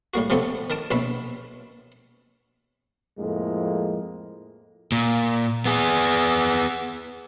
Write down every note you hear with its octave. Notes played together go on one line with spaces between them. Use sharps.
A2 G3 A#3 F#4
C3 F3 B3 C#4 G4 A4
D#3 A#4 A5 D6
A#1 B2 C#4 E5 B5
F2 A2 G#3 A#3
A#2
B3 G#4